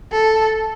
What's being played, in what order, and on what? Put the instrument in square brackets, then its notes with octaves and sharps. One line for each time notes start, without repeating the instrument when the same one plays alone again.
[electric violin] A4